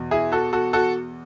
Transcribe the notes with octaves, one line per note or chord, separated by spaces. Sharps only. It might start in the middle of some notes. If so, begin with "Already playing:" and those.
Already playing: E2 B2
E4 G#4
F#4 A4
F#4 A4
F#4 A4